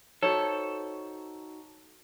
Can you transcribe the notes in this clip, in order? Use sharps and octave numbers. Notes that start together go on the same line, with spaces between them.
D#4 F#4 A4 C5 C#5